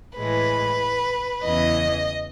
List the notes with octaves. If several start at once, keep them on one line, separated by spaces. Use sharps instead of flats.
A2 E3 G#3 B4
E2 C#3 E3 D#5